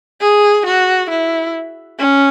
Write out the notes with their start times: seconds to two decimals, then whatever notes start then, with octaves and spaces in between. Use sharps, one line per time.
0.21 G#4
0.66 F#4
1.10 E4
1.99 C#4